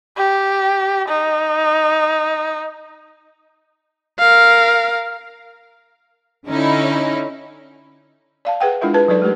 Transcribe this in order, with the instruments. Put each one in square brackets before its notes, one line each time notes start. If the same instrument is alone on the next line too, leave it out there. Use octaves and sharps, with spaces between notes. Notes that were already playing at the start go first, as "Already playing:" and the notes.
[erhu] G4
D#4
[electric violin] A#4 F5
[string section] D3 C#4 D#4 E4
[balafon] D5 F5 A5
G#4 B4 F#5 G5
G#3 D4 E4 F4 A#4 E5
G#4 B4 A5
F#3 D#4 A4 B4 D5
G#3 A3 G4 A#4 B4